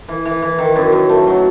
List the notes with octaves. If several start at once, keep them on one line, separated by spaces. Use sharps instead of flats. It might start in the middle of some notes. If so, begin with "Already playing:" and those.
E3
E3
E3
D#3
F#2
F#2
A3
F#3